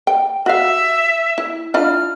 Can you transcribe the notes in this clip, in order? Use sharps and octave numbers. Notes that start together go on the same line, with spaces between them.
G5
F#4 E5 F5
E4
D4 E4 F4 F6